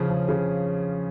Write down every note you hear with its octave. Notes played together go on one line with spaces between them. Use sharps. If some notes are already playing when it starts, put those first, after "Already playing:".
Already playing: C#3 F3 C#4 G#4
F3
C#3